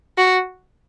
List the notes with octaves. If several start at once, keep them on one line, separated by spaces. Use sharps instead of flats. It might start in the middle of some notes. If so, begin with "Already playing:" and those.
F#4